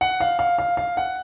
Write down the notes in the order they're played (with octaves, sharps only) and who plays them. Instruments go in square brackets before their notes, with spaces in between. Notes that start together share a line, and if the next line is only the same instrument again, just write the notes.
[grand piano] F#5
F5
F5
F5
F5
F#5